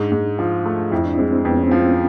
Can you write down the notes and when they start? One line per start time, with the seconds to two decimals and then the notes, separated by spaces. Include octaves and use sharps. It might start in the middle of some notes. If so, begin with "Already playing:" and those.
Already playing: G#2 D4
0.12 G#2
0.39 F3
0.66 A3
0.91 F2 E4
1.06 D4
1.18 G#3 C4
1.32 C4
1.45 F2 B3
1.57 C#4
1.64 C4
1.71 F3
1.80 C4